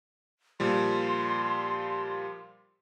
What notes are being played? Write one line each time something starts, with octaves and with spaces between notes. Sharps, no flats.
A#2 F3 G3 C6